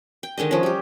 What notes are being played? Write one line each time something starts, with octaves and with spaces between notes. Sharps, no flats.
G5
D3 D#3 G#3 D#5
F3 C#4
G3 G4